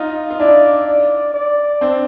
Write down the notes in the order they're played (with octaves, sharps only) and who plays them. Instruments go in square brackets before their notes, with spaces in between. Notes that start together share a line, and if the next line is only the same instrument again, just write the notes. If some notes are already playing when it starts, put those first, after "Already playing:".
Already playing: [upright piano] D#4 F4 [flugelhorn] D#5
[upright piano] F4
[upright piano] D4 E4 [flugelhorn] D5
[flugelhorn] D5
D5
[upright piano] C4 D4